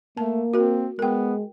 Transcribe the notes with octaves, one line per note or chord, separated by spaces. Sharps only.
A3 A#3 A5
C4 F#4 A#4
G#3 B3 A#4 G5